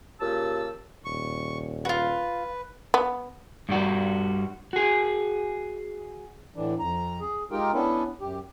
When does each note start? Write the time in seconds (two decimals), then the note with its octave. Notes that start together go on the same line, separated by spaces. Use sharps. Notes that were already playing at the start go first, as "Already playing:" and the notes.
0.19 A#2 C#3 G4 A5 E6
1.05 D#1 C#6
1.85 F4 F#4 B4
2.94 B3
3.69 G2 G3 F#4
4.73 F#4 G#4
6.56 A2 D3 E3 D4
6.79 F2 A#5
7.21 G#4
7.51 G#3 D#4 F4 G4 A#4 G5
7.74 B3 C#4 D4 E4 A4 B4
8.21 F#2 G4